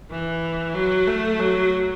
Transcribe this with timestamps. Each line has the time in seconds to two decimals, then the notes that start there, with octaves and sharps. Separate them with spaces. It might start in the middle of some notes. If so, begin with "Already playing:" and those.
0.11 E3
0.75 F#3
1.07 A3
1.39 F#3